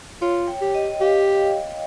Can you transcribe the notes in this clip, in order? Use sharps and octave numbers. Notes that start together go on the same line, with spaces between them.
F4 C#5
G5
G4
D#5
G4 F5